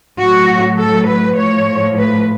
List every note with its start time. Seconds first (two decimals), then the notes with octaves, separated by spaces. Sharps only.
0.18 A2 F#3 F#4
0.79 A4
1.08 B4
1.37 A2 F3 C#5
1.98 B4